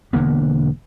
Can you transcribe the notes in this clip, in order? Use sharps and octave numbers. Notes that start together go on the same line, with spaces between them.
E1 D3 A#3 B3